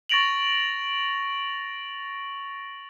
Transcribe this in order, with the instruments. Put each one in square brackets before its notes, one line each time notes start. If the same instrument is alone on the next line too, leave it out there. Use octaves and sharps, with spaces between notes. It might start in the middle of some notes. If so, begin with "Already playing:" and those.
[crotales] C#6 A6 A#6 D7 F7 F#7